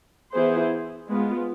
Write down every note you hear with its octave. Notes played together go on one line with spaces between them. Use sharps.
E3 B3 E4 G#4 C5
G#3 B3 F4